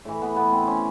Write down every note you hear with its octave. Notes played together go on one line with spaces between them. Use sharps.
A2 E3
B3
B3
C4
C#4